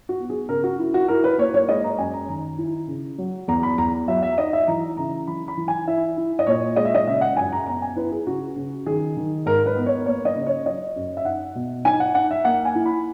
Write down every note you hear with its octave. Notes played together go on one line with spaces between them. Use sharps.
F#4
B3
G#4
C#3 A#4
F#4
E4
F#4
E4 A#4
B4
A#3 C#5
C#5
G#3 D#5
A#5
F#2 G#5
A#5
D#3 A#5
E4
C#3
F#3
E2 A#5
B5
E2 A#5
F#3 E5
E5
D#4 D#5
E5
E3 A#5
C#3 A#5
E3 B5
B5
E3
G#5
E4 E5
E4
D#5
A#2 C#5
G#3 D#5
E5
D#5
C#3 E5
F#5
F#2 G#5
A#5
B3 A#5
G#5
E4 B4
G#4
C#3 F#4
C#3
D#3 G#4
D#3
G#2 A#4
B4
B3
C#5
A#3 C#5
D#5
C#3
C#5
F#3 D#5
F#2
E5
D#4 F#5
B2
D#4 G#5
F#5
D#4 F#5
E5
A#3 F#5
G#5
E4
B5